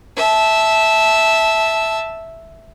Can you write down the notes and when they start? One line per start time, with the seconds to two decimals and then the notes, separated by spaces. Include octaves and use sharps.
0.16 E5 A5